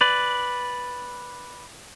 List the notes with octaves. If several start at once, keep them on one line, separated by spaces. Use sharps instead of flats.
B4 D5